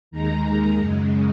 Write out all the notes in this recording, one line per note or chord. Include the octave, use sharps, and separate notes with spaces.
D#2 D#3 G#3 A#5
F#2 C#3 G#3